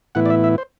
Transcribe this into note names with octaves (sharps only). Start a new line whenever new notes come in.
A2 E3 B3 E4 F#5
D5
E5
E5
C5